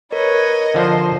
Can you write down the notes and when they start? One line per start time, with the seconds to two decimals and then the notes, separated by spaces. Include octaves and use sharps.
0.12 A#4 B4 C#5 D#5
0.74 D3 F3 C5